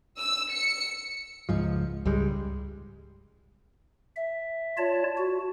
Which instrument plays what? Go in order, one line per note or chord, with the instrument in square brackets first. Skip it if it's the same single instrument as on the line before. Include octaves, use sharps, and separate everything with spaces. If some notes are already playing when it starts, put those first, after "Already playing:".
[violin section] E6
C#7
[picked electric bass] C#2 G#2 F3
C#2 G#2 G3 G#3
[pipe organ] E5
F4 C#5 D5 A5
F#4